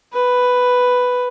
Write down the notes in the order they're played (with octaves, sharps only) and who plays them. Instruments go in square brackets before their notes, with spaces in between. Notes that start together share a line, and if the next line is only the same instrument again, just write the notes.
[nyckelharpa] B4